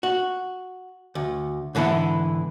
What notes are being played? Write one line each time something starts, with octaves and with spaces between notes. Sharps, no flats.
F#4
D2
G#2 D3 E3 B3 E4